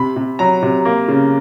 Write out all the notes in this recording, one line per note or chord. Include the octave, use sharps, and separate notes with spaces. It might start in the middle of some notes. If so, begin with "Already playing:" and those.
Already playing: C3 B5
C3
F#3 A#5
C3
A#3
C#3